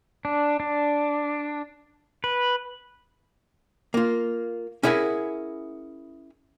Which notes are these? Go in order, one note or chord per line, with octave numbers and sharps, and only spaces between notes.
D4
D4
B4
A#3 F4
C#4 E4 G#4 A#4 F#5